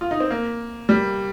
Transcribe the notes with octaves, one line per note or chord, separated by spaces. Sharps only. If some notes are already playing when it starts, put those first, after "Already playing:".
F4
D#4
C4
A#3
G3